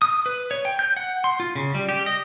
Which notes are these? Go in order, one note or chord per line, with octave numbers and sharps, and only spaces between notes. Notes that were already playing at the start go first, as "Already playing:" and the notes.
D#6
B4
C#5
G5
G6
F#5
C6
F4
C#3
G3
G4
D#5